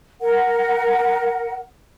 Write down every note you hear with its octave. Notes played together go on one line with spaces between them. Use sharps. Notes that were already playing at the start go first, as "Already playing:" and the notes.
A#4 F#5